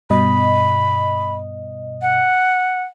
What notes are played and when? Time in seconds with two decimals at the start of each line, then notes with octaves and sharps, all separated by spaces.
0.10 G2 B2 D#5 B5
2.02 F#5